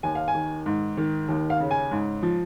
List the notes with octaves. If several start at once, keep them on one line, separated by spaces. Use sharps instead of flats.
D#2 G#5
F5
G#5
D#3
G#2
D#3
D#2
F5
C#3
G#5
G#2
F3